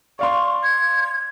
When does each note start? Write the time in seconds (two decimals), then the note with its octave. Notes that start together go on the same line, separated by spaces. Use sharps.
0.19 D5 F5 C6 C#6
0.63 G#6